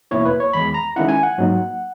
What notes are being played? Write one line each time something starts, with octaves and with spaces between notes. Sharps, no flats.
E2 B2 A#3 E4 C#5
B4
C#5
E2 D#3 G#3 B5
A#5
D#3 G#3 C#4 E4 F#5
G#5
F#5
G#2 F#3 A#3 D#4